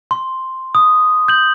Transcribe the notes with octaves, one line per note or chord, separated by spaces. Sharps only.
C6
D#6
G6 F#7